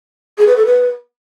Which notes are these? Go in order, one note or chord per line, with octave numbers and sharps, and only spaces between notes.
G#4
B4
A4
B4